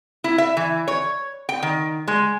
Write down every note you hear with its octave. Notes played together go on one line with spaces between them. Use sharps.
E4
E5
E3
C#5
G5
D#3
G#3